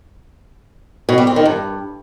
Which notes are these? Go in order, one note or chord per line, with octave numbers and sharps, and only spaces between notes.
B2
G3
C4
D#3
G2